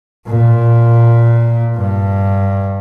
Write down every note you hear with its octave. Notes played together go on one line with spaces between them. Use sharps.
A#2
G2